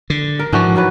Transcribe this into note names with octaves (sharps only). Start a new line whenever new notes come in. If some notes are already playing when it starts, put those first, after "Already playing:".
D3
A#4
G#2 E3 F3 D4 F#4
D#3 F#3 B4